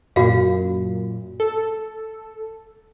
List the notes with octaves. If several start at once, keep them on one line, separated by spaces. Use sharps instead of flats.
F#2 A#2 F#4 F5
A4